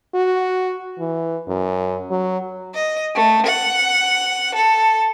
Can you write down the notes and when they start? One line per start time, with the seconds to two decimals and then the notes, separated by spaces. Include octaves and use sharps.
0.15 F#4
1.00 E3
1.48 F#2
2.10 F#3
2.74 D#5
3.15 A3
3.46 F#5
4.54 A4